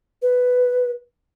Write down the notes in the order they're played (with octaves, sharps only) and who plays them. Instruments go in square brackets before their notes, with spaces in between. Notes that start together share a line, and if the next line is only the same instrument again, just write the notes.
[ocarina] B4